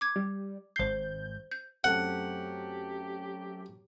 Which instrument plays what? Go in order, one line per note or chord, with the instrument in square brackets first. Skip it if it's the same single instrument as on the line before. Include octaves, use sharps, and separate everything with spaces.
[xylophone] D6 G#6
[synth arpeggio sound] G3
[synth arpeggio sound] G#1 G6 [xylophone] C5 C7
[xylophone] G6
[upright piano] F#2 A3 C4 [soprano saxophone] G4 [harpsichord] F#5